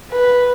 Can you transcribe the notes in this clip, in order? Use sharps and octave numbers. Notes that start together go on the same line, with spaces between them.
B4